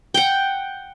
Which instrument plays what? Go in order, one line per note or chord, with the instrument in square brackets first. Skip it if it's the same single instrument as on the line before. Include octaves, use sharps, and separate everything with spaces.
[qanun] F#5 G5